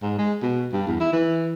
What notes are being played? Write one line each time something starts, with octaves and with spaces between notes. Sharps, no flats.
G#2
G#3
B2
G2
E2
E4
E3